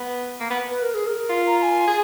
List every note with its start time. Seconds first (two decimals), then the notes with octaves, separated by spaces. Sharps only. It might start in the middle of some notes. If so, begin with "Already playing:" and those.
Already playing: B3
0.40 A#3
0.50 B3
0.70 B4
0.82 A#4
0.94 G#4
1.07 A#4
1.29 F4
1.46 A#5
1.59 A#5
1.63 G#5
1.87 G#4